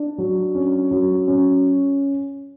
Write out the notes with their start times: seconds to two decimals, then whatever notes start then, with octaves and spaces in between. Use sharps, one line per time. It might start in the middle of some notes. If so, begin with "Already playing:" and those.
Already playing: D4
0.18 F#3
0.55 C#4
0.91 F#3
1.28 C#4